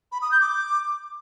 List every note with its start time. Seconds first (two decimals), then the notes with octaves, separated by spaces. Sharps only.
0.12 B5
0.22 D#6
0.31 G6
0.41 D6